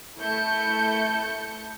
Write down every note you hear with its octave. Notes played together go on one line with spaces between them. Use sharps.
A3 E4 G6 C#7